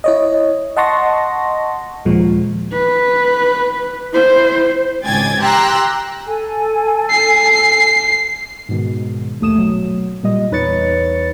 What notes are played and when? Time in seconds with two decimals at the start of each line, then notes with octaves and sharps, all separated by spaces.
0.04 E4 C#5 D#5
0.77 D#5 F#5 A5 C6 C#6 A#6
2.05 D#2 A#2 F3 G#3
2.73 B4
4.13 E4 C5
5.04 G#1 C#2 G5 G#5 G#6 A6
5.41 G4 G5 A#5 C6 E6 F#6
6.26 A4 G#5
7.10 C7
8.69 G#2 B2 D#3
9.40 A#1 D#2 A3 D#6 E7
9.57 B2 F#3
10.23 A#2 G3 D#5
10.51 E2 D#4 B4 C#5 A6 C#7